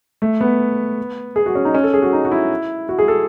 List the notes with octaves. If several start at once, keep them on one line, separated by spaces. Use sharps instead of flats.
A3
B3
G#4
F#4
C#4
D#4
C#4
A4
G#4
F#4
D#4
F#4
E4
F#4
G#4
A4